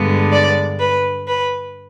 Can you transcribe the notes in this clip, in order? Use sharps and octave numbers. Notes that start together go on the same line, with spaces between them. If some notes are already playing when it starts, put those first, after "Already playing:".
Already playing: G2 D3 G#3 B3
D5
B4
B4